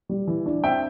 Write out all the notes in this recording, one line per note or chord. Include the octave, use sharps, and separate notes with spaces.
G3
E3
D4
C4 E5 G5